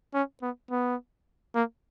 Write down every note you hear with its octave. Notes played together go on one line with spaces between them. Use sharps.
C#4
B3
B3
A#3